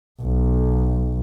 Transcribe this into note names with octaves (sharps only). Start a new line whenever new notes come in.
B1